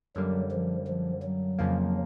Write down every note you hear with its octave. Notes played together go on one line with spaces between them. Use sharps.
F#2 D3 F#3 G3 A#3
F3
F3
F#3
F2 C#3 F3 A#3